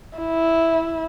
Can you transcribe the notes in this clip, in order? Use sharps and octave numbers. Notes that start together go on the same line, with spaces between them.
E4